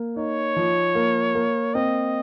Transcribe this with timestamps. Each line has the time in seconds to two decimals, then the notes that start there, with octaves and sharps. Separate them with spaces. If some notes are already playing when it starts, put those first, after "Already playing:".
Already playing: A#3
0.16 D#4 C#5
0.57 F3
0.95 A#3
1.35 A#3
1.74 C4 D#5